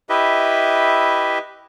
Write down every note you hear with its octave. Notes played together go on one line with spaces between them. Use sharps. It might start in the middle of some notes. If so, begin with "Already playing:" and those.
E4 G4 B4 D#5 E5